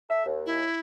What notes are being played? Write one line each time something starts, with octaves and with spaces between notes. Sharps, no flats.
A4 E5
D#2
E4